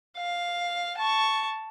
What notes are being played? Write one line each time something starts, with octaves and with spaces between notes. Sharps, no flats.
F5
A5 C#6